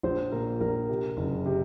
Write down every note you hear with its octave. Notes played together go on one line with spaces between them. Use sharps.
A#1 C5
A#2 A#4
A#1 A#4
C3
F#1
C3